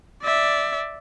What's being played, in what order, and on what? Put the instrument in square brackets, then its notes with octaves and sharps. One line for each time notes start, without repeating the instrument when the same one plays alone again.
[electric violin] D5 E5